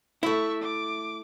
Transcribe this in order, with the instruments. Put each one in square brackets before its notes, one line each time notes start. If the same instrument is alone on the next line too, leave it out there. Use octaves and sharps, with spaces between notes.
[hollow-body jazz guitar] A3 E4 [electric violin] E5 C#6
[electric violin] D6